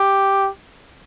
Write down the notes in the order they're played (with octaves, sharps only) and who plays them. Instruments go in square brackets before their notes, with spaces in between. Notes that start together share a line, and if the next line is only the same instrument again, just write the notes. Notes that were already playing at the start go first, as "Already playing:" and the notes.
Already playing: [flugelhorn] G4